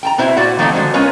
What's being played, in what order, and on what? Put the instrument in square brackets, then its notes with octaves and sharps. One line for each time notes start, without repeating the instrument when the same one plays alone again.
[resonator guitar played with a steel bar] G5 A5 A#5
B2 C4 E4 C5 E5
A#2 F#4 D5 F#5
D#3 F3 A3 A#3 C4 D#4
D3 G#3 C#4 F#4 C5
G#3 B3 C#4 F4 A#4 C#5